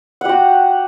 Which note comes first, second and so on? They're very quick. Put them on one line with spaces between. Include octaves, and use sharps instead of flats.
F#5 G4 F#4